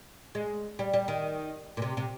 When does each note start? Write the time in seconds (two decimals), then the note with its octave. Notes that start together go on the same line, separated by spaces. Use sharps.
0.35 G#3
0.79 G3
0.94 G3
1.08 D#3
1.77 A#2
1.82 C3
1.97 C3